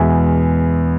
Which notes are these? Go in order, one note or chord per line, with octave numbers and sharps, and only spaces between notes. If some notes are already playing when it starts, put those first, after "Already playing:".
Already playing: E2 B2 G#3 E5 G#5